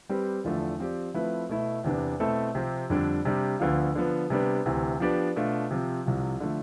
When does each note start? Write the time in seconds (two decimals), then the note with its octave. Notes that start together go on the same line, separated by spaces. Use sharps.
0.09 G3 C4 G4 B4
0.44 E2 D3 F3 A3
0.79 F3 C4 G4 D5
1.14 F3 A3 C4 E4 B4
1.49 B2 A3 E4
1.84 E2 C3 E3 B3 D4
2.20 B2 A3 C4 E4 A4
2.55 C3 F3 C4 G4
2.90 F2 D3 G3 D4
3.25 C3 G3 D4
3.60 D2 D3 F3 B3 F4
3.95 D3 F3 B3
4.30 C3 G3 B3 D4
4.66 D2 C3 E3
5.00 F3 B3 D4 G4 D5
5.36 B2 A3 D4 F4
5.71 C3 F3 C4
6.06 C2 C3 F3
6.40 D3 F3 A3